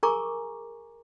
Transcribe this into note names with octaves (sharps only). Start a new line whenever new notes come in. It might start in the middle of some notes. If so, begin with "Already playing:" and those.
G#4 A#4 G#5 A#5 C#6 D6